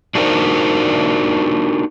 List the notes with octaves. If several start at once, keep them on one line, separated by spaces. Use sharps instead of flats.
D4 D#4 F#4 A#4 C5 D5